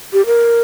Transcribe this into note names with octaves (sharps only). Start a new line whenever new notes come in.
G4
A#4